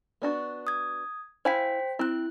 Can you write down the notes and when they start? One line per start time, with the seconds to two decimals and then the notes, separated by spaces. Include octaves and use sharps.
0.22 B3 D4 F#4
0.67 D#6 G#6
1.45 E4 C5 F5 G5 G#5 B6
1.99 C4 E4 F#6